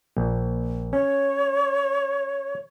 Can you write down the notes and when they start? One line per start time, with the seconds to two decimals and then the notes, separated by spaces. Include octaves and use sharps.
0.17 A#1
0.93 C#4 C#5